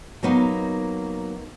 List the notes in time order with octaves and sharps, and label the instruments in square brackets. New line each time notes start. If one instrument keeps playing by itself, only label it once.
[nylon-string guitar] F#3 A#3 B3 D#4